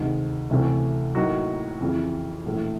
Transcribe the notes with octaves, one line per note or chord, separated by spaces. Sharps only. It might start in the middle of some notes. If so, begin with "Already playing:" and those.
Already playing: D2 C3 D#3 G#3
D2 C3 E3 A3 C#4
A2 F#3 A#3 D#4 F#4
F2 C#3 E3
A#1 A2 E3 A3